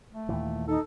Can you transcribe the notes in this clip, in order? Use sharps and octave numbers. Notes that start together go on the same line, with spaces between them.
A3
D#2 A#2 E3
D#4 A4